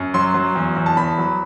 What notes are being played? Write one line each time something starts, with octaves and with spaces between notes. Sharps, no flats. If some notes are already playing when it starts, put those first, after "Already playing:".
Already playing: F#2
F#3 C6
F#3
E2
E2
A5
E2 B5
F#3